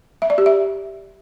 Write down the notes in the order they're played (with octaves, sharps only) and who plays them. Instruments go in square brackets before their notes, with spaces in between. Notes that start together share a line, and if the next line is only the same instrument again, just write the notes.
[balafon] E5
D5
G4
E5